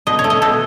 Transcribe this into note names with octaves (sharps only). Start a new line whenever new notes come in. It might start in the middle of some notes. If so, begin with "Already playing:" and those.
B2 D#5
C#5
A3
D#5
B2 A4